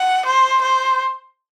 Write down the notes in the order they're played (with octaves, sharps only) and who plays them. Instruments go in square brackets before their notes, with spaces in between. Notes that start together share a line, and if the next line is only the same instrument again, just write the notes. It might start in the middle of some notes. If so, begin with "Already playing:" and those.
Already playing: [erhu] F#5
C5
C5